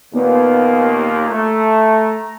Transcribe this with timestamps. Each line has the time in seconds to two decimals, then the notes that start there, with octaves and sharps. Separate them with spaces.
0.14 D#2 A#2 A#3 B3
1.30 A3 A#5